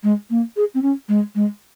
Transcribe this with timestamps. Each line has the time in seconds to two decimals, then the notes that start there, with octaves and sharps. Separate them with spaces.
0.03 G#3
0.30 A#3
0.57 G#4
0.74 C4
0.82 C#4
1.09 G#3
1.35 G#3